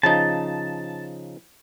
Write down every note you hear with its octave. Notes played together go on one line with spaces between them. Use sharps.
C#3 F3 D#4 A5